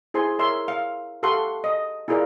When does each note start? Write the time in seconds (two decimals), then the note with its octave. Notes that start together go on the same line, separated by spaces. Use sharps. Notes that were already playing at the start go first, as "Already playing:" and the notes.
0.14 E4 G#4 C5 G#5 C6
0.39 A#4 C#5 E5 C6
0.68 F5
1.23 G4 A4 F5 F#5 C6 C#6
1.64 D#5
2.08 E4 F4 G#4 A#4 D5 F5